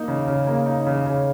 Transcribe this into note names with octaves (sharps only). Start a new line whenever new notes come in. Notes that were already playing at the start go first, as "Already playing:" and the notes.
Already playing: A#3 D#4
C#3
C#3
A#3
D#4
C#3
C#3